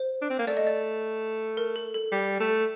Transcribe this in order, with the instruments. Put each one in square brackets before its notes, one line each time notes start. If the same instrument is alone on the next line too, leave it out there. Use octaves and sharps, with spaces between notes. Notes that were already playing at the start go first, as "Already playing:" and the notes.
Already playing: [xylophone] C5
[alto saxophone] D4
C4
A#3
[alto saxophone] A3 [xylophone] D5
[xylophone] D#5
D5
A#4
A4
A4
[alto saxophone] G3
A3